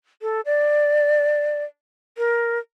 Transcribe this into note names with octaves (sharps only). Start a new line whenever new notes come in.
A4
D5
A#4